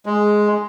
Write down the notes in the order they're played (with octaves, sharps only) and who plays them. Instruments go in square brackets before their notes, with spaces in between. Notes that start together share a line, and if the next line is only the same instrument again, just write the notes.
[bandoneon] G#3